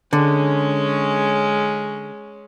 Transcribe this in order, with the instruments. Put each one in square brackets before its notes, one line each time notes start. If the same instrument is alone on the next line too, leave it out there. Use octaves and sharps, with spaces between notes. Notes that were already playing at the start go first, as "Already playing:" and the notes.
[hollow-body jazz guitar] D3 [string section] G#3 C#4